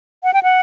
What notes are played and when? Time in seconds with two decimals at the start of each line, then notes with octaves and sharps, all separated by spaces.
0.23 F#5
0.34 G5
0.43 F#5